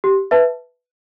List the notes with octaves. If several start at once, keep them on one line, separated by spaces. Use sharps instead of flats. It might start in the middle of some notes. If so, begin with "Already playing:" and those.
G4
B4 E5 A5